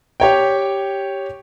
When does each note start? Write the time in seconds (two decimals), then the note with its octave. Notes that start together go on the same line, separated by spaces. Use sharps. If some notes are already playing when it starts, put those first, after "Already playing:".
0.20 G4 C#5 G5